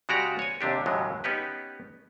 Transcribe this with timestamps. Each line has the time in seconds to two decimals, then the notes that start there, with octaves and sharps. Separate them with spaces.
0.09 C#3 G#3 F#4 G4 D5 A#5
0.39 C#5 G#5
0.61 D#2 C3 D4 G4
0.86 D#2 A2 C#3 E3 F#3 G#3
1.24 B3 C#4 D#4 G4 B4